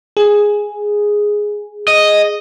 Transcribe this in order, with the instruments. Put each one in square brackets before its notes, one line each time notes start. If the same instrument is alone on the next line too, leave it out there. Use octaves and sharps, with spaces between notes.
[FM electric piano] G#4
[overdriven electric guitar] D#5